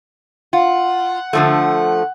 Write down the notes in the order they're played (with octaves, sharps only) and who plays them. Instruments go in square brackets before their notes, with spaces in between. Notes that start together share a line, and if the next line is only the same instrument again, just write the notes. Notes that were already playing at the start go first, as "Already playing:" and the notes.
[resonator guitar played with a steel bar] F4 [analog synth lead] F#5
[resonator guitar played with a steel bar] D3 F3 A3